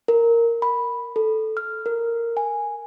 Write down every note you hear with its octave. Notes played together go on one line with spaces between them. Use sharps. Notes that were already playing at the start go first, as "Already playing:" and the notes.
A#4
B5
A4
F6
A#4
G#5